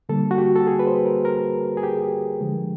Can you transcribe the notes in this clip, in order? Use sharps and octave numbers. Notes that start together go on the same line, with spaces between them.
D3 G3 A#3 A4
F#4
G4
A4
G#4
B4
C5
A#4
A#4
G#4
G4
D3 F3 G#3